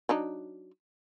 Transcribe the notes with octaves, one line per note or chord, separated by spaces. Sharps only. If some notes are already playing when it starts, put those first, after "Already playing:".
F#3 D4 D#4